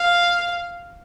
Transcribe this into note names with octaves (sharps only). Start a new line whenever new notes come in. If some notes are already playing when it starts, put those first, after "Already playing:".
Already playing: F5